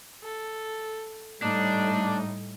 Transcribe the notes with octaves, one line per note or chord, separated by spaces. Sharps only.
A4
A2 G3 D4 D#4